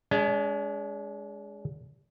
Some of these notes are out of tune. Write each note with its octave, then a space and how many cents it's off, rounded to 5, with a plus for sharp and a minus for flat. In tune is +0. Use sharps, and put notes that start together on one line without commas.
G#3 +0 D4 -45